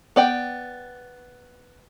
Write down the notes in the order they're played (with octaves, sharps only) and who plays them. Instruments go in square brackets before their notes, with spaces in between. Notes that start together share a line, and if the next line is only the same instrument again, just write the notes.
[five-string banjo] B3 D5 G5